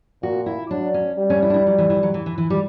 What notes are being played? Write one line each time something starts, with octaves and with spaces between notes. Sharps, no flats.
A#2 F#4
E4
F#3 D4
C#4
G3
C#4
E4
D4
E4
F#3
E3
E3
F#3
E3
E3
E3
G3